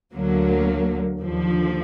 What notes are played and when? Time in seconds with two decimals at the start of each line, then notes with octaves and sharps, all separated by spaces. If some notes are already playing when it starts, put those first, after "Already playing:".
0.12 D2 D3 F#3 A#3
1.17 D#2 D3 F3